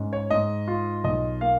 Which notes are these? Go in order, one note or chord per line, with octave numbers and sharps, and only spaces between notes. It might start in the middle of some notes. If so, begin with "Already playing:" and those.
Already playing: G#2 C#4
C#5
G#2 D#5
F4
B1 D#5
A#3 F5